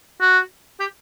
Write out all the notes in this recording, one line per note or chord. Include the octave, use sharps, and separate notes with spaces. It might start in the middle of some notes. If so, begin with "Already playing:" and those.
F#4
G4